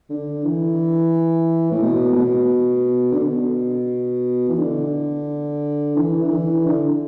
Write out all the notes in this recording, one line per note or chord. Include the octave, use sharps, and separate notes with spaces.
D3
E3
A2
B2
A2
B2
D3
B2
E3
D3
E3
D3
E3
D3